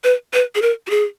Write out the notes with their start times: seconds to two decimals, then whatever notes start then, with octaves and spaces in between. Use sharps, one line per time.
0.04 B4
0.34 B4
0.55 G#4
0.62 A#4
0.87 F#4
0.90 G#4